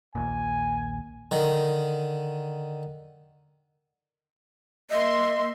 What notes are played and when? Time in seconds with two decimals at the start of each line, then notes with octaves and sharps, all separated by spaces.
0.15 A#1 D#2 A#2 G#5
1.31 D3 D#3
4.90 A#3 D#5 E5 C6